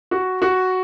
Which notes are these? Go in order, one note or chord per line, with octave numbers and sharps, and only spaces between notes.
F#4
F#4